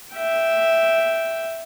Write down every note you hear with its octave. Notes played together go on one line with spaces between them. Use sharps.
E5 G5